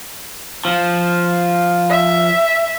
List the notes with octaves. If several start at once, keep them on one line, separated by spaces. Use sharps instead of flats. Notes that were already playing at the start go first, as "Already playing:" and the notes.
F3
E5